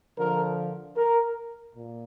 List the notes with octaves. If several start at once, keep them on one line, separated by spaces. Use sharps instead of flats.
D3 F3 A#4
A#4
A#2